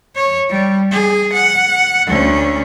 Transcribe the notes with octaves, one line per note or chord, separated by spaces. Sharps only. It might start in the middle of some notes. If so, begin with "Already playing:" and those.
C#5
G3
G#4
F#5
D2 C#4